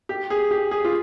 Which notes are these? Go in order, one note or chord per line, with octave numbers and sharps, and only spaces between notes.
G4
G#4
G4
G#4
F4